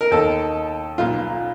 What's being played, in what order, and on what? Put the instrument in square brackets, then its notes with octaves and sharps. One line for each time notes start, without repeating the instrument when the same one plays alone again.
[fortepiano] A#4
D#2 D#3 A4
B1 A#2 F4